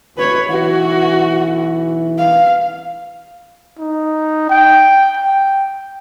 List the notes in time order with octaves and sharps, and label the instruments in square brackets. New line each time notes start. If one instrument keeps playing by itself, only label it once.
[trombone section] D2 [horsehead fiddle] B4 C#5
[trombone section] B1 E3 [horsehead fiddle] F#4
[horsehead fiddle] F5
[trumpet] D#4
G5
G5